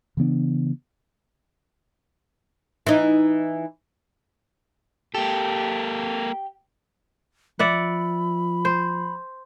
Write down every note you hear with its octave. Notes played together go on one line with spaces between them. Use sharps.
C#3 E3 B3 D4
E3 D#4
A#3 G4 A4
F3 D5 E5 F#5 B5
C5